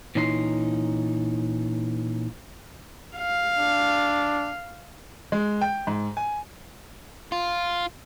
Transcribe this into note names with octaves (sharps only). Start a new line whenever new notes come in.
A#2 E3 C#4 D#4 G4 C6
F5
D4
G#3
G5
G#2
G#5
F4